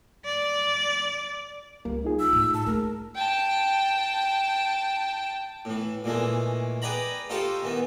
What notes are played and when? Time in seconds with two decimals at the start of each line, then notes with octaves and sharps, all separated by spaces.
0.25 D5
1.85 C#2 G3 A#3
2.04 D#4 F4 G#4
2.19 E6
2.33 A2
2.54 A5
2.66 A3 A#3 A#4
3.15 G5 A5
5.65 A2 E3
6.04 A#2 E3 G#3 A3
6.82 G#4 B4 D5 G5 A#5 B5
7.30 D#4 F4 G4 A4 C5 C#6
7.62 D#3 E3 B3